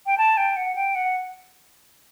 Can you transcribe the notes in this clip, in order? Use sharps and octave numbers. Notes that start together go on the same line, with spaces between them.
G5
A5
G5
F#5
G5
F#5